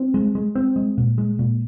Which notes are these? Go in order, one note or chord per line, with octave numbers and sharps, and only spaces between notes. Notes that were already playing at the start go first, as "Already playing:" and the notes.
Already playing: C4
G#3
G#3
C4
G#3
A#2
G#3
A#2